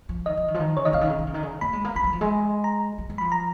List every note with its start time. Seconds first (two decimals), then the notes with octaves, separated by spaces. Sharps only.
0.09 F3
0.26 D#3 D#5
0.37 F3
0.48 D#3
0.54 F3
0.60 D#3
0.77 C#3 C#5
0.85 D#3 D#5
0.93 C#3 F5
1.01 D#3
1.10 C#3
1.19 D#3
1.27 C#3
1.34 D#3
1.43 C#3
1.61 A#3 B5
1.73 G#3
1.85 A#3
1.96 A#3 B5
2.04 F#3
2.13 F3
2.21 G#3
2.64 A#5
2.98 F#3
3.10 G#3
3.18 F3 B5
3.32 A#5